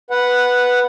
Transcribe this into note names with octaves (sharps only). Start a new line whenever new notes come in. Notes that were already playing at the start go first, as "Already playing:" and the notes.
B4 F#5